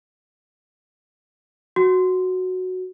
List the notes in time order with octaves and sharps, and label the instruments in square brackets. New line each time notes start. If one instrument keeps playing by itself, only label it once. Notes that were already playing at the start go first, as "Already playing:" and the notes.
[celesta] F#4